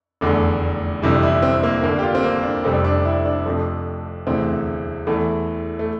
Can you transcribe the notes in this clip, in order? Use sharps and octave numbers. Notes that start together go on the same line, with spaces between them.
F1 E2 D3 A3
G1 F2 C3 E3 G3
E4
C4
A#3
G1 G2 D3 A#3
G4
F4
C4
A#3
D4
F1 F2 C3 G3 C4
D4
E4
D4
F2 C3 F3 A3
E1 D2 C3 E3 C4
E2 E3 A3
A3